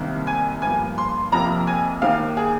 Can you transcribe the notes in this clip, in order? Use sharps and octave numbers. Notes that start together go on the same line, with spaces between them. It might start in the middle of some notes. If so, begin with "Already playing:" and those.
Already playing: C2 C3 D#3 A#3
G#5
G2 F3 A#3 G#5
C6
F2 C3 F3 A#3 A#5
G#5
D#2 D#3 A#3 F5
G#4